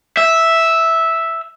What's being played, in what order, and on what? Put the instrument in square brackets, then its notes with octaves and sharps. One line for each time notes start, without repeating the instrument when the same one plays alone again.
[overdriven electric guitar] E5